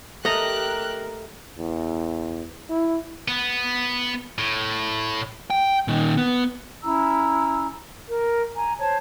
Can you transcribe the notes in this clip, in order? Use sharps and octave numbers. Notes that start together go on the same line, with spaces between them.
A3 G4 A#4 D#5 A#5 F#6
E2
E4
B3
A2
G5
A#2 D#3
B3
C#4 E4 A#5 E6
A#4
G#5 A#5
C5 C#5 A5